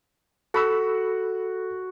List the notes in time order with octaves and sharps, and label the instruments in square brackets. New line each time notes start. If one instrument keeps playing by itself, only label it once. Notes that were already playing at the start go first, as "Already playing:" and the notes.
[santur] F#4 [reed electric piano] A4 B5 E6